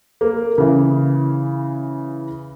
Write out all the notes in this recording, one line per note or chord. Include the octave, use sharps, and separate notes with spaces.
A#3
C#3 E3